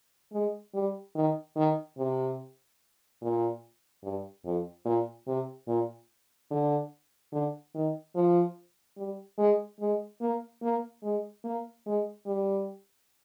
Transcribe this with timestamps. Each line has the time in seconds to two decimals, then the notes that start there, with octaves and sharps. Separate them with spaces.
0.33 G#3
0.74 G3
1.15 D#3
1.56 D#3
1.98 C3
3.21 A#2
4.03 G2
4.45 F2
4.85 A#2
5.27 C3
5.68 A#2
6.51 D3
7.32 D3
7.75 D#3
8.15 F3
8.98 G3
9.38 G#3
9.81 G#3
10.21 A#3
10.63 A#3
11.03 G#3
11.44 A#3
11.86 G#3
12.26 G3